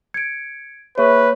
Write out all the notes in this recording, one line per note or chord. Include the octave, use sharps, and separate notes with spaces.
G#6 C#7 D7
A#3 G#4 B4 C#5 E5 C#6